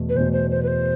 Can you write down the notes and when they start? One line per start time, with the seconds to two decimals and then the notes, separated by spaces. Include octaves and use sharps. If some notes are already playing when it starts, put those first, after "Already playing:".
Already playing: E2 B2 A3
0.09 B4
0.15 E2 B2 A3 C5
0.33 C5
0.51 C5
0.63 B4
0.68 C5